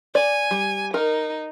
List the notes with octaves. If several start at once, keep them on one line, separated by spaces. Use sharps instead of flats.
D5 G#5
G3
D#4 A#4